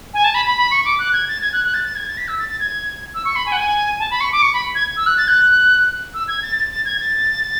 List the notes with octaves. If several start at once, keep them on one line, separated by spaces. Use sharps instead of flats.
G#5
A5
B5
B5
B5
C#6
D6
F#6
G#6
A6
G#6
F#6
F#6
A6
A6
G#6
A6
B6
E6
A6
A6
G#6
E6
C#6
B5
G#5
F#5
G#5
A5
B5
C#6
D6
C#6
B5
G#6
E6
F#6
A6
F#6
E6
G#6
A6
A6
A6
G#6
A6